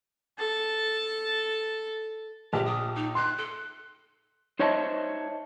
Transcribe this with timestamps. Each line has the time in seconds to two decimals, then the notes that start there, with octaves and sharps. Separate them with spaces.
0.38 A4 A5
2.53 A#1 G4
2.65 D#6
2.95 D#4
3.15 C6 F#6
3.37 A4
4.59 D#4 C5 C#5 D#5 E5 A5